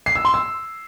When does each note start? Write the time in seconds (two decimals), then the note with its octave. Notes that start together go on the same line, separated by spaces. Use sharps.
0.06 C7
0.15 E6
0.25 C6
0.34 E6